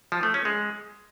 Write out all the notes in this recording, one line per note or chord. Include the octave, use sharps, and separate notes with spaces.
F3
A3
C#4
G#3